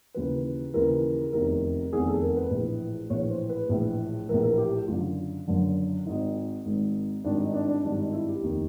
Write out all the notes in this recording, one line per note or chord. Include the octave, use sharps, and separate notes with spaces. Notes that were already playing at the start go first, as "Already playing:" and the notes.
D#2 C#3 E3 B4
D#2 C#3 E3 A#4
F1 E2 C3 D#3 A#4
F1 E2 C3 D#3 G#4
A4
A#4
B4
A#1 A2 E3
A#1 A2 E3 C#5
C5
B4
A#1 A2 E3
A#1 A2 E3 A#4
A#4
G4
F#1 F#2 D3 F4
F#1 F#2 D3
G#1 G#2 D#3 D#4
G#1 G#2 D#3
G#1 G2 D#3 D4
D#4
D4
D4
G#1 G2 D#3 D4
D#4
E4
G4
F1 D#2 D#3